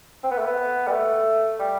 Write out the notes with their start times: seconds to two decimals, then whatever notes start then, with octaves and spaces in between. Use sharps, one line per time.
0.24 C4
0.31 B3
0.38 A3
0.46 B3
0.87 G3
0.92 A3
1.60 G3